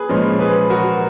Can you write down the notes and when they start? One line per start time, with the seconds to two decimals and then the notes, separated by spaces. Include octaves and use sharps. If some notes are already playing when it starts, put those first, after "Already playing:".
Already playing: G#4 B4
0.09 A#2 F3 G#3 C#4
0.39 G#4 B4
0.70 F#4 A#4